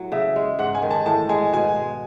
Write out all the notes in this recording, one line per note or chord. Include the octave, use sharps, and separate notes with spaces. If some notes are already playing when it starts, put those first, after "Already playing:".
Already playing: A2 F#3
C#3 E5
G#3
G#2 F#5
G#5
D#3
A5
A2 A5
G#3 G#5
B2 G#5
G#3